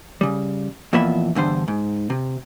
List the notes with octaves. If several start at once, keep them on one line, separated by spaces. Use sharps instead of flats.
C#3 G3
F2 A#2 E3 B3 E5 B5
E2 G2 D3 C5
G#2
C3